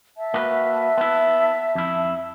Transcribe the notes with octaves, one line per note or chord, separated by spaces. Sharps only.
E5 A5
A#3 F#4 B4
B3 E4
F2 E4